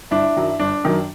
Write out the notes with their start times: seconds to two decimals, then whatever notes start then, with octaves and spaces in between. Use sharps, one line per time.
0.11 G1 D4 E4
0.36 F#2 D#3 F#3
0.59 G1 D4
0.84 F#2 D#3 F#3